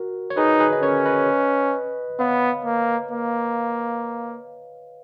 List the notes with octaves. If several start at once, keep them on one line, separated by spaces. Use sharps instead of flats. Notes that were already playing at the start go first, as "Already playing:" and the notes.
Already playing: F#4 A#4
C#5
D#4 G#4 B4
G#4 B4
D#5
C#4 A#4 C#5
B4 D#5
B3 C#5 F5
A#3
A#3